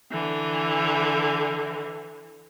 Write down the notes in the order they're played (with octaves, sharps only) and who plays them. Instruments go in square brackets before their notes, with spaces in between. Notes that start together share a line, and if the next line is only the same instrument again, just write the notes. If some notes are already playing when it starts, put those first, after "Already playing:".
[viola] D3 E3